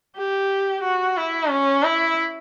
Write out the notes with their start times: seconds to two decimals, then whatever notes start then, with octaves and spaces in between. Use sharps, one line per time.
0.17 G4
0.83 F#4
1.17 E4
1.50 C#4
1.83 E4